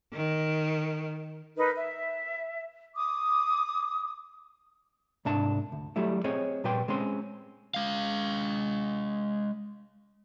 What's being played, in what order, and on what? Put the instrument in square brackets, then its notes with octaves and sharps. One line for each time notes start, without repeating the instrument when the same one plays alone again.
[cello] D#3
[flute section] D#4 A#4 B4
E5
D6 D#6
[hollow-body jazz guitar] C2 G#2 D4 A5
D2
F#3 G3 A3 E4
C4 G#4 C#5 D#5
A#2 G3 B4 G5 C6
G#3 C4 C#4 C6
[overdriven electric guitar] G#3 F5